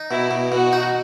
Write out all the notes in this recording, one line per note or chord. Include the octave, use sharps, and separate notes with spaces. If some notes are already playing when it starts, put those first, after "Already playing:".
Already playing: D#4
B2 E4
B2
B2 F#4
D#4